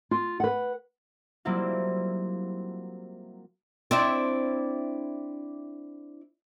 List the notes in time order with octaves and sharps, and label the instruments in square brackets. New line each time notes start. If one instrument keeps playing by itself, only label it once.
[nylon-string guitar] F4
B4 F#5
[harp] F#3 G3 A#3 C4 E4 F4
[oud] C4 D4 E4